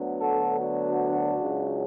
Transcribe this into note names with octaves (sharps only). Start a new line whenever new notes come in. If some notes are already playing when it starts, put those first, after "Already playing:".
Already playing: D2 D3 F#3 B3
F#4 A4
D4 F#4
C#2 C#3 F#3